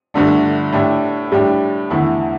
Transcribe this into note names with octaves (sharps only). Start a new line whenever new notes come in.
G1 G2 D3 A3 D4
A2 A3 D4 G4
A2 G3 D4 G4
E2 D3 A3 E4